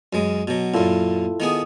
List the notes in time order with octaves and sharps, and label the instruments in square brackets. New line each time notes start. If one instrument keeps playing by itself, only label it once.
[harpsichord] F#2 G#3
B2 F#3
[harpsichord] F#2 A#2 [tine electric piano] E4 F4 A4
[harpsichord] D#3 B3 G#4